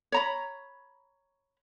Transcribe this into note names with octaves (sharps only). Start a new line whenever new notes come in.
C#5 A#5 B5